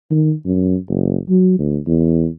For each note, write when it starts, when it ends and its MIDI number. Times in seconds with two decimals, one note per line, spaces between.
0.11 0.33 51
0.45 0.76 42
0.88 1.17 30
1.29 1.57 54
1.59 1.78 38
1.87 2.27 40